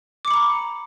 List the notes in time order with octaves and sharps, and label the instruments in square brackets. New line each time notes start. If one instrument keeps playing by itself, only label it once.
[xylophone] D6
C#7
B5
A#5